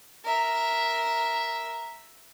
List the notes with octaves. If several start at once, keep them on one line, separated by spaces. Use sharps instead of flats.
A#4 E5